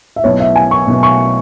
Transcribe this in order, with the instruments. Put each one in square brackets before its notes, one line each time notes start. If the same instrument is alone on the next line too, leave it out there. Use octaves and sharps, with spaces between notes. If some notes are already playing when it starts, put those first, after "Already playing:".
[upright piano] E5
[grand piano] B1 B2 B3 E4 [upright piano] C#5
[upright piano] E5
G#5
C#6
[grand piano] B1 B2 B3 E4
[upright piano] C#6